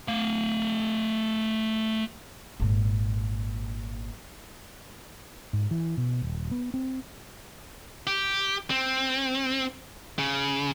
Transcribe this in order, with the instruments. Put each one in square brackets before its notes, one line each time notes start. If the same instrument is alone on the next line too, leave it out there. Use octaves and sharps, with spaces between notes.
[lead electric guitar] A3 F5
[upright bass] G#1 A#2
[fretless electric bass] G#2
E3
B2
D#1
B3
C4
[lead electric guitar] G4
C4
C#3